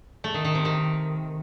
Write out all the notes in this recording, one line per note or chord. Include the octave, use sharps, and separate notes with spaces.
A3
D#3
D#3
C3
D#3